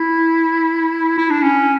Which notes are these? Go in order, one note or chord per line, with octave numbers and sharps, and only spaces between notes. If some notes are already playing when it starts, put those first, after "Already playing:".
Already playing: E4
E4
D4
C#4